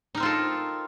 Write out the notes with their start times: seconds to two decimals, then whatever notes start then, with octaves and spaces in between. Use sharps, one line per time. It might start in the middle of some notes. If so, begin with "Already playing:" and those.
0.15 D#4
0.17 A#4
0.20 C4
0.23 F4
0.25 A4